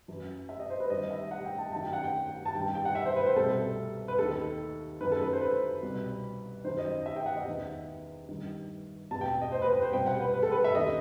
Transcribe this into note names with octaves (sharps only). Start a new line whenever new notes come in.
F#2 E3
E5
D#5
C5
B4
G2 D#3 D#5
E5
F#5
G5
A5
F#2 D#3 A5
G5
F#5
G5
A5
G2 D#3 G5
G5
F#5
E5
C5
B4
C5
C2 B2 A4
B4
D#2 D#3 A4
F#2 D#3 B4
A4
B4
C5
B4
C2 B2
F#2 D#3 C5
D#5
E5
G5
F#5
D#5
E2 D#3
G2 D#3
E2 B2 A5
G5
D#5
C5
B4
B4
C5
C2 B2 G5
F#5
B4
B4
A4
B4
E5
D#2 D#3 D#5